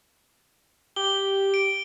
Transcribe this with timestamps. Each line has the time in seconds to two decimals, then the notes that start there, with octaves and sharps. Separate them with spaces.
0.96 G4 G7
1.54 D7